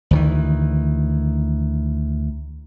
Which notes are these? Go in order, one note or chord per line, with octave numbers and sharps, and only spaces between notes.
D2 D#3 E3